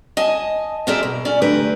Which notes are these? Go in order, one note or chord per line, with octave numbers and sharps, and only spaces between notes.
D#5 G#5 A5
G4 G#4 A#4 C5 D5 E5
B2
C#4 D5 G#5
D3 A3 G4 A#4 B4